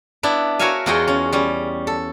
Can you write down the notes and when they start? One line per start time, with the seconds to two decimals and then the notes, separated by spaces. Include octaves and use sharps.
0.23 B3 D4 E4
0.59 F#4 A#4 C#5 E5 F5 G#5
0.86 E2 F4 F#4 G#4 D#5 G5
1.08 C#4
1.33 G3 C#4
1.87 A4